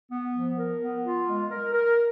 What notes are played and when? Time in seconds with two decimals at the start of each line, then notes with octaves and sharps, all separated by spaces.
0.11 B3
0.35 F3
0.57 A#4
0.81 B3
1.05 F4
1.28 G#3
1.51 A#4
1.74 A#4